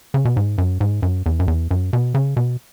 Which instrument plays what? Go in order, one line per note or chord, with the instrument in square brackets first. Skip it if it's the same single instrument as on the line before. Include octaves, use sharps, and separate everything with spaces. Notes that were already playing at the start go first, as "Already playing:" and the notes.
[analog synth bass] C#3
B2
G#2
F#2
G#2
F#2
E2
F#2
E2
F#2
B2
C#3
B2